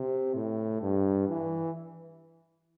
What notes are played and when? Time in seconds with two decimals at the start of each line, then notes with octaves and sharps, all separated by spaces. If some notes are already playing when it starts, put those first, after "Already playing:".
Already playing: C3
0.35 A2
0.82 G2
1.29 E3